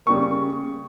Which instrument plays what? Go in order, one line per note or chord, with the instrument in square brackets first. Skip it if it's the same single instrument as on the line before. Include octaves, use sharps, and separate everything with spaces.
[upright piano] C#3 G3 A#3 C#6